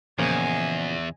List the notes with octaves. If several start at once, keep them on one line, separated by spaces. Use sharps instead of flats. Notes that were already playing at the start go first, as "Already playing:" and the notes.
E2 A#2 C#3 F3 D#5 G#5